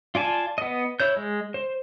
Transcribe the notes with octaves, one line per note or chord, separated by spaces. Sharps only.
F4 D5 G#5 A5
B3 D#5
E4 C#5 G6
G#3
C5